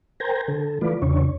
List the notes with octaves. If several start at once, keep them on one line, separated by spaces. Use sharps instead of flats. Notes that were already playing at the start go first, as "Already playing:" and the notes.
A#4 C5 G5 G#5 A#5
D3 A4
E3 A3 F4 B4 D5
E2 C#3 D4 C#5